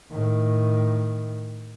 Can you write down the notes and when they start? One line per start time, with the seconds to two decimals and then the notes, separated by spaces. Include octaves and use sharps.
0.11 A2 D#3